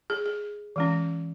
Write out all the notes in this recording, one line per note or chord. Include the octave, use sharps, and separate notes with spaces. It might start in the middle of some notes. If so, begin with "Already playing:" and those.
G#4
G#4
E3 G#3 C#4